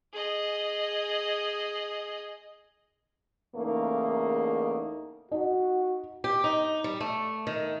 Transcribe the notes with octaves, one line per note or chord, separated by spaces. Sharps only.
G#4 D#5
E2 C#3 A3 A#3 D#4
D#4 F#4
G4
D#4
G3
A3
D#3